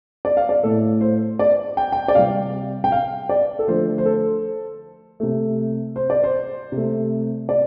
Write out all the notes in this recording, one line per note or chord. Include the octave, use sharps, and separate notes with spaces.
D5
F5
D5
A2 A3 A4
C5
D5
G5
G5
D5
C3 G3 F5
G5
F5
D5
A4
D3 F3 A3 C5
C5
A4
C3 A3
C5
D5
C5
C3 A3
D5